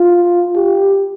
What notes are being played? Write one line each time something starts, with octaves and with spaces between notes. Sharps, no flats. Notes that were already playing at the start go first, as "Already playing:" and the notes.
Already playing: F4
G4